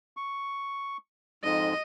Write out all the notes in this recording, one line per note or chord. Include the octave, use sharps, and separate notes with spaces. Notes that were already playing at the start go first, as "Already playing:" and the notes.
C#6
F2 G#2 D#5